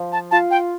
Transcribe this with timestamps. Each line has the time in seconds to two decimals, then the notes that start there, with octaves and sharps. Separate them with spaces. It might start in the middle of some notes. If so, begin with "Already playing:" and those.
Already playing: F3
0.12 A5
0.31 F4 A5
0.51 G5